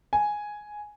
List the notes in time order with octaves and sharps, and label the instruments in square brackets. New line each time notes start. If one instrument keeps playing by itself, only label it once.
[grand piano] G#5